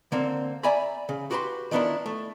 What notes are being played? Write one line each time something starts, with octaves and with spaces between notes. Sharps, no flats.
D3 A#3 C4
D5 E5 G#5 A#5 B5
C#3
F#4 G4 B4 A#5 C6
D#3 F3 B3 D4 E4 A#4
A3